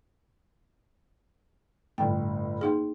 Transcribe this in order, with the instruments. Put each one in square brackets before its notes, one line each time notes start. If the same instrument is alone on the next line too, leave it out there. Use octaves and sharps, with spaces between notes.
[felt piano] G1 A2 [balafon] G5
[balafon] A#3 D#4 G#4